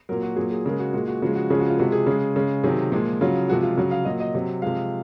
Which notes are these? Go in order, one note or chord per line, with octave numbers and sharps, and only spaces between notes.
A#2 F#3 A#4
F#4
A#2 F#3 G#4
G#4
C#3 G#3 A#4
F#4
A#2 G#3 F#4
F#4
C#3 F3 G#3 F#4
F#4
C#3 F3 G#3 G#4
F#4
F4
C3 F3 G#3 F#4
G#4
C#3 G#3
C#3 G#3
C3 D#3 F#3 G#4
A#2 F3 G#3
C#3 F#3 F4
C3 F3 G#3 F#4
F4
C#3 F#3 F#4
F5
A#2 F#3 D#5
D#5
C3 F#3
C3 F3 G#3 F5